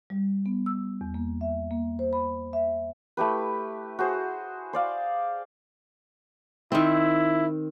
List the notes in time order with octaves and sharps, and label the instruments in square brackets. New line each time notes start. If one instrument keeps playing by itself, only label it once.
[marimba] G3
B3
E6
E2
A#3
E5
A#3
C5
B5
E5
[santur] A3 E4 G4 B4
F#4 G#4 C5
C5 D5 F5
[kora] D#3 C4 [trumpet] E4